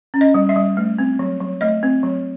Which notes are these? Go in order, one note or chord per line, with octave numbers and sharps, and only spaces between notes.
C#4
D#5
G3
E5
G3
A3
C4
F#3
F#3
A3 D#5
C4
F#3